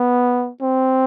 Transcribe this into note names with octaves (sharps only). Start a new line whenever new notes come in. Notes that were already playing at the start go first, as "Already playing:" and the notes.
Already playing: B3
C4